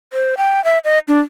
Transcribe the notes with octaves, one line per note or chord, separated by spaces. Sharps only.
C5
G5
E5
D#5
D4